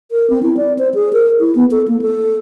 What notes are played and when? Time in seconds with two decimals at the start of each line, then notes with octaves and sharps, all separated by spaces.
0.12 A#4
0.30 C4
0.43 E4
0.57 D5
0.79 C5
0.94 G#4
1.13 A#4
1.40 E4
1.55 B3
1.71 A4
1.88 A#3
2.02 A4